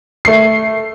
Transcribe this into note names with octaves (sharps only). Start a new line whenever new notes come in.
A3 C7